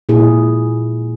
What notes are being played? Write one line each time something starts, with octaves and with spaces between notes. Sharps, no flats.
A#2 E4 G#4